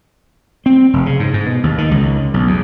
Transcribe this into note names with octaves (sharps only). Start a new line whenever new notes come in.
C4
F1
C#3
G#2
G#2
B2
D#2
D#3
C#2
B1
E2